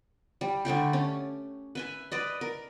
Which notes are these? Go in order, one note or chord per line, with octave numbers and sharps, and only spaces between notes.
G3
D3 G3 A3 G4
C#4
B4 E5 G#5
B4 D5 D#5
A#4